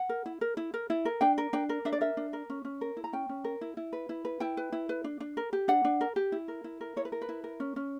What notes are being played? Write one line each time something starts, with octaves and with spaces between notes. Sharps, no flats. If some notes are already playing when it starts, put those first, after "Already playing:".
Already playing: F#5
A#4
E4
A#4
E4
A#4
E4
A#4
D4 G5
A#4
D4 G5
A#4
D4 E5
D5
A#4 E5
D4
A#4
C#4
C#4
A#4
E4
A#5
C#4 G5
C#4
A#4
E4
E4
B4
E4
B4
E4 G5
B4
E4
B4
D4
D4
A#4
G4
D4 F#5
D4
A#4
G4
E4
A#4
E4
A#4
E4 C#5
B4
A#4
B4
E4
A#4
C#4
C#4